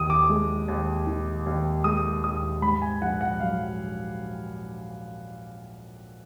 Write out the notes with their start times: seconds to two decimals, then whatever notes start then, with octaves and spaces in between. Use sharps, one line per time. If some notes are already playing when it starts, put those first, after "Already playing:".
Already playing: D#2 D#3 D#6
0.10 D6
0.30 G#3
0.68 D#2
1.07 D#3
1.46 D#2
1.84 G#3 D#6
2.24 D#2 D#6
2.62 G#2 B5
2.82 G#5
3.01 A#1 F#5
3.21 F#5
3.40 F#3 F5